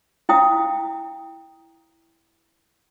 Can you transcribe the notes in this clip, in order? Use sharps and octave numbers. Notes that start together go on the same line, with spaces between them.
E4 F5 G5 A#5 D#6